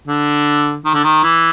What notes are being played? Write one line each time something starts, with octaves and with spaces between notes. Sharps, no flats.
D3
D#3
D3
D#3
E3